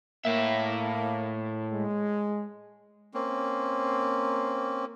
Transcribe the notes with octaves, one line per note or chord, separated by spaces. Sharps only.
A2 A#3 E5
G#3
A#3 C4 C#4